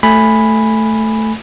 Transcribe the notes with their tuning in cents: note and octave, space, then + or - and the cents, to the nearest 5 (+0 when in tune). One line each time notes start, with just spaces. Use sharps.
A3 +0 G#5 -5 B5 +0